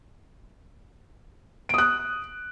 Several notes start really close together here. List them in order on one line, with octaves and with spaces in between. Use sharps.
D7 D#6 F#6